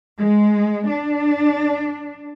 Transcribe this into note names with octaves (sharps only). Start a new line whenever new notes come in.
G#3
D4